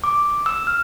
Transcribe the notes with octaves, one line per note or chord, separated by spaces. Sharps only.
D6
E6
F6